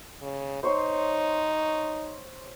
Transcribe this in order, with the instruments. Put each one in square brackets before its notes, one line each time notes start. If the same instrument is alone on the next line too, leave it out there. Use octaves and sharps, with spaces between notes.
[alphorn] C#3
[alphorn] D#4 [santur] C5 C#5 C6